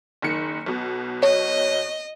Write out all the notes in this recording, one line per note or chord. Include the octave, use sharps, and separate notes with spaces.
F#1 D#3 C#7
B1 B2
C#5 D#5